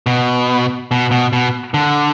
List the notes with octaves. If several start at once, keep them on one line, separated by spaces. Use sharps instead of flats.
B2
B2
B2
B2
D3